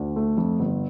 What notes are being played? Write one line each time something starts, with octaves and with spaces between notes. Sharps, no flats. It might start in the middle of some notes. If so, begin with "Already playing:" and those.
Already playing: D2
A3
F2
G1